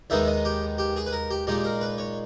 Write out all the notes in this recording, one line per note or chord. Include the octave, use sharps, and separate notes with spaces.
D#2 D#3 G#3 B3 D#4 E5
D#5
G4
G4
G#4
B4
A#4
G4
A#2 G#3 D#4 G4
A#4
B4
C#5